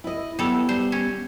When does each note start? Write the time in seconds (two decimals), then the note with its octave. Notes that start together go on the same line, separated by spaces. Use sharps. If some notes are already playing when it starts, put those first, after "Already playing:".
0.04 E4 D#5
0.39 F#3 G3 B3 E4 A4
0.69 G3 C5
0.92 C#4